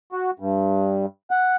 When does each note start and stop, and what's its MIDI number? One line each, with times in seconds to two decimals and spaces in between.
0.12 0.31 66
0.40 1.06 43
1.31 1.56 78